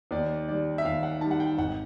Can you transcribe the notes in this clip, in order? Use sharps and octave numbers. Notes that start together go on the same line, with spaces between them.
D#2 D5
D#3 G3 D5
E5
D#2 F5
F#5
D#3 G3 A5
F#5
G5
G#1 F#5